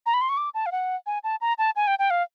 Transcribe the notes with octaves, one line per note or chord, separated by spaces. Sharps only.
A#5
B5
C6
C#6
D6
A5
F5
F#5
G#5
A5
A#5
A5
G#5
G5
G5
F5